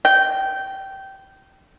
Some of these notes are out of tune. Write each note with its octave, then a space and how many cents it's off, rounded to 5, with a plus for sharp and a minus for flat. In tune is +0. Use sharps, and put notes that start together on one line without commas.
G5 -20